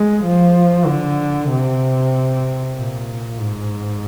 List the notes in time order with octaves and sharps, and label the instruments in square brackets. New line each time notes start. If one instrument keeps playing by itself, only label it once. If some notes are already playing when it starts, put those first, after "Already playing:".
Already playing: [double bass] G#3
F3
D3
C3
A#2
G#2